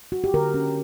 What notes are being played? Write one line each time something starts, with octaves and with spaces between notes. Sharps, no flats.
F#4
G4
D3 A#4
C#4